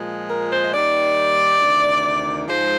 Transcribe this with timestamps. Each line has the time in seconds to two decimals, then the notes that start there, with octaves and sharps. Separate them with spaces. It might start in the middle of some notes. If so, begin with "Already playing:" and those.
Already playing: A#2 F3 G#3
0.30 A#4
0.52 C5
0.64 D#5
0.73 D#2 D#3 G3 D5
1.60 D2 C3 D#3
2.47 G#2 F3 G#3 C5